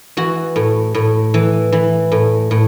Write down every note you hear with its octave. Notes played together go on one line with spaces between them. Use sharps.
E3 F#4
A2
A2
E3
E3
A2
A2